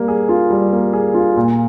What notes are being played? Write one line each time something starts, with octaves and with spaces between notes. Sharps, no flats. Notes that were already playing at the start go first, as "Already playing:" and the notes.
Already playing: G3 A#3
G#4
F4
G3
A#3
G#4
F4
A#2